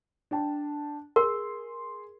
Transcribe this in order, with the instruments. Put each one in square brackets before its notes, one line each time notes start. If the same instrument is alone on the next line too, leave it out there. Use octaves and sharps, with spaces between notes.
[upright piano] D4 G5 A5
[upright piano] G#4 C6 [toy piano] A#4